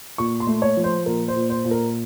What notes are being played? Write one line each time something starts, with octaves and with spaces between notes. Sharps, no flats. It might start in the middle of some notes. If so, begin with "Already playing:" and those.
A#2 C#6
C6
A3
C#5
F3
C5
A#2 A#4
C5
A#2
C5
A#2
A#4